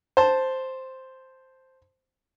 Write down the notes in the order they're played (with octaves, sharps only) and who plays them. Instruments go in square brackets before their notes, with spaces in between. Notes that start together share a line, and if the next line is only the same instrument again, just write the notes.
[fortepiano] C5 A5